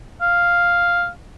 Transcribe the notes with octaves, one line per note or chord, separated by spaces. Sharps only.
F5